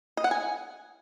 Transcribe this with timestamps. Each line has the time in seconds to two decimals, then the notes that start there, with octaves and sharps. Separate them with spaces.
0.17 D#5
0.24 F#5
0.31 G#5